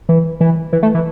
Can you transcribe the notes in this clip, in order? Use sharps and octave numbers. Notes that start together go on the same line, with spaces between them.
E3
E3
E3
A3
E3